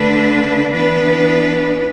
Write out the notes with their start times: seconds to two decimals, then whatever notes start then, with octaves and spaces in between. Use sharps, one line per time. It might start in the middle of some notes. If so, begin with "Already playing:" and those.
Already playing: D3 A3 D4 B4
0.72 E3 B3 D4 B4